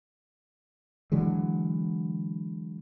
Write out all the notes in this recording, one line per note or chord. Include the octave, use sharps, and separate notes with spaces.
D3 E3 F#3 G#3